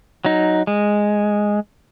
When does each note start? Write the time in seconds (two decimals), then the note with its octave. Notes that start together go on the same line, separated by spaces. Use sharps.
0.25 F#3 D#4
0.67 G#3